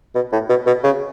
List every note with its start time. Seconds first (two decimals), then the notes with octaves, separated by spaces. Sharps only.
0.15 B2
0.33 A2
0.49 B2
0.67 B2
0.83 C#3